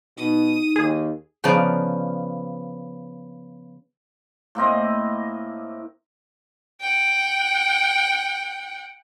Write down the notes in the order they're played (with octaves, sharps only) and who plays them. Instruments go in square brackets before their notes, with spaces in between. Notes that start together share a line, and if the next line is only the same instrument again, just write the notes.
[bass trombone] B2 [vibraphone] D#4 [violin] D#6
[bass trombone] D#2 [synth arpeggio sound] G#4
[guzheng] C#3 F3 B3 D5 A#5
[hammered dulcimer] A2 A#3 C4 D#5
[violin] F#5 G5